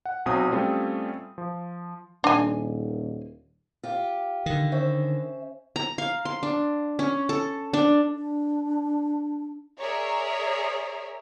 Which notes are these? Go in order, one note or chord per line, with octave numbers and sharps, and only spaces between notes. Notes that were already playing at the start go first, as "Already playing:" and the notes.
F#5
B1 F#3 C4 D#6
G3 A3 C4 C#4 F4
F3
D#1 D4 G#5
F4 G4
D3 D#3
C#4 C5 E5
A#5
F5
C6
D4
C#4
A4
D4
D4
G#4 A#4 C#5 D5 E5 A#5